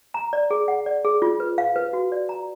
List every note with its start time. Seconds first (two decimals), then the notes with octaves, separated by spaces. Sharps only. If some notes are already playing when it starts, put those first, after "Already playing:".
0.14 A#5
0.33 D5
0.51 G#4
0.68 F#5
0.86 D5
1.05 G#4
1.22 F4
1.40 B4
1.58 F5
1.76 B4
1.93 F#4
2.12 D5
2.29 A#5